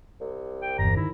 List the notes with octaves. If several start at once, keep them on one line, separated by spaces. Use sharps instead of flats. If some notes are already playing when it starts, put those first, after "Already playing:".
C2
G5
G1 E2 A#5
D#3 E4